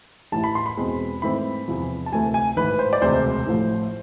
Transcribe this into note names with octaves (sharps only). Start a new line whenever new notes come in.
A1 A2 E3 A5
B5
C6
B5
E2 B2 G#3 C4
G#2 E3 A3 C4 B5
E2 C3 F3
A5
D2 C3 E3 A3 G#5
G#5
A1 G#2 E3 B4
C5
D5
E1 D2 C3 G#3 C5
A1 A2 F3 A3